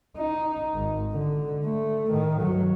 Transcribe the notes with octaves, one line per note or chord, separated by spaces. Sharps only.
D#4
G#1
D3
A3
A2 D#3
G2 F#3